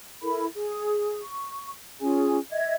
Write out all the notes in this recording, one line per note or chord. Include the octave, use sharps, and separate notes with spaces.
E4 A4 A#4 B5
G#4
C#6
C#4 F4 G#4 G#5
D#5 E5 G#6